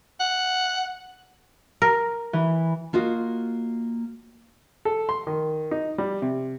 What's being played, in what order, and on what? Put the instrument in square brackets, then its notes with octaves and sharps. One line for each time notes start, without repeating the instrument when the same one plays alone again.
[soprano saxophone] F#5
[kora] A#4
[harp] E3
[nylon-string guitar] A#3 F4 F#4 D#5
[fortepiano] A4
C6
D#3
D#4
G3
C3